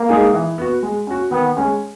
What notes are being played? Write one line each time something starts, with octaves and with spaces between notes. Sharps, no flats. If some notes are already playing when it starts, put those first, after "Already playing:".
Already playing: A#3
G#3 D#4 G#4
E3
B3 F#4
G#3
C#4 F#4
D#3 B3
G#3 C#4 G#4